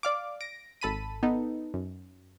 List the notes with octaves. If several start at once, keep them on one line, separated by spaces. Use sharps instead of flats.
D5 F5 D6
A#6 D7
G#1 A4 A5 B5 B6 D#7
B3 D#4 A4
F#2